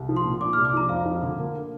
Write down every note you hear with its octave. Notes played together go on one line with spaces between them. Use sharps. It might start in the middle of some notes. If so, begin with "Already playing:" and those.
Already playing: C2
F3
C6
A#2
D4 D6
F6
C2
D6
F3 A#5
F2 F5
F3
D3
A#3